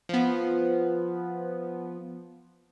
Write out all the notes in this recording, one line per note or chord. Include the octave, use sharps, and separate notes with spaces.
F3 B3